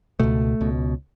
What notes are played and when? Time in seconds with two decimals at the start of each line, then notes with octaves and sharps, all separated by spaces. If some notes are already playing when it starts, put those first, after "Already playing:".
0.20 C#2 B2 A3
0.61 C#2 B2